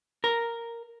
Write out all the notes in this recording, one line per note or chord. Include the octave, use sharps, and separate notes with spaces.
A#4